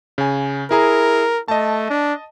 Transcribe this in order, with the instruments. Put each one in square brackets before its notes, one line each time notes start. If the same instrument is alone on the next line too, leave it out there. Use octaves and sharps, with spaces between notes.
[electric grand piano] C#3 G#5
[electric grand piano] E4 G#4 A#5 [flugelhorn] A#4
[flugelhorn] A3 [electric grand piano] D#5 A5
[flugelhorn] D4